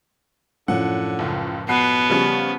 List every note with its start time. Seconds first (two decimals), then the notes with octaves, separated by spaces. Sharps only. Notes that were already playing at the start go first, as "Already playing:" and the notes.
0.68 F#2 A2 D3 F3 F#5
1.19 F#1 C#2
1.69 B2 B3 F#6 C7
2.10 C#3 F3 G3 C#4